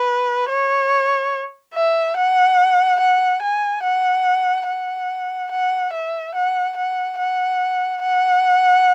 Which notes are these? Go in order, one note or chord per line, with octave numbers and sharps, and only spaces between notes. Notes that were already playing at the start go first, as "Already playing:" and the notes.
Already playing: B4
C#5
E5
F#5
F#5
G#5
F#5
F#5
F#5
E5
F#5
F#5
F#5
F#5